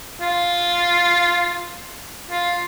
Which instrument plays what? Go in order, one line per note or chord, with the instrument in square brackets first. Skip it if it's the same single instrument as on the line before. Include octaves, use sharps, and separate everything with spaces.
[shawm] F4
F4